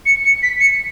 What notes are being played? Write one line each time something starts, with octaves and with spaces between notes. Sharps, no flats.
C#7
C#7
B6
C#7